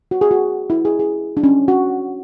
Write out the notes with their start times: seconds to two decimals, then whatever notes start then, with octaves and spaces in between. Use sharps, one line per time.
0.11 F#4
0.21 G#4
0.31 F#4
0.70 E4
0.85 G#4
0.99 G#4
1.37 D4
1.43 C#4
1.68 F#4